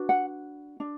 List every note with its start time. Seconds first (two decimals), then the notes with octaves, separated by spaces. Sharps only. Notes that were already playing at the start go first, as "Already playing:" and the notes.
Already playing: D4 F#4 B4
0.09 F#5
0.80 D4